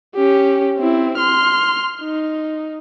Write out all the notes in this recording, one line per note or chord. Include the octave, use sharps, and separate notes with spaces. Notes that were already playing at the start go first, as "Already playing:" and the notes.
C#4 G4
C4 E4
C6 F6
D#4